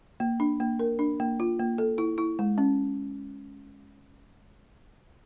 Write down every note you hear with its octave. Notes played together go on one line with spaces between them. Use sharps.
A#3
D4
A#3
A#4
D4
A#3
F4
A#3
A4
E4
E4
G#3
C#4